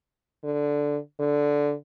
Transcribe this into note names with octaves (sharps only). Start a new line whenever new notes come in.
D3
D3